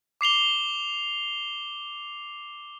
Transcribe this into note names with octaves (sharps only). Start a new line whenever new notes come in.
D6 C7 F7 G7